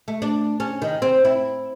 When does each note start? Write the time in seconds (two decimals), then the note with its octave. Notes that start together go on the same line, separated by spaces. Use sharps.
0.08 A3
0.22 D4
0.60 C#4
0.82 D#3
1.02 C4
1.25 E4